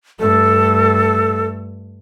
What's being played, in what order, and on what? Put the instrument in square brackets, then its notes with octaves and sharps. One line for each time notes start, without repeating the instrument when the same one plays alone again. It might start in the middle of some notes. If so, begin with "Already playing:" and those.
[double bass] G2 A3 [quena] A4